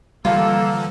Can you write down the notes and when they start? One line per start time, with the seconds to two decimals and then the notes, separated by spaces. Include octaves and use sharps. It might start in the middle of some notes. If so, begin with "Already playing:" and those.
0.25 D3 E3 F3 G3 A#3 F4 A4 E6